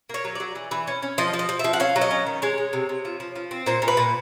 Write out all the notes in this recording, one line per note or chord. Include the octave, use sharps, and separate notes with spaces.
A#3 C#5
F#3
F#3 D5
E3
E3
C#4
C#4
F3 D#5
F3
D#5
F3
F3 E5
F#5
C#4 F5
F#3
D#5
C#4
D#3
G#3 C#5
G#3
C3
C3
F3
F3
F3
C4
A#2 C5
A#2
B4
A#2